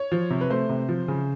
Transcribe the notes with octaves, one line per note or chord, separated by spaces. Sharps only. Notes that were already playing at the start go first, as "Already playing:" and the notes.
Already playing: C#5
F3
C3
B4
A3 C5
C3
F3
C#3